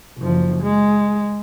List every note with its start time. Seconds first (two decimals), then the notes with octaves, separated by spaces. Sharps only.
0.17 F#1 F3
0.63 G#3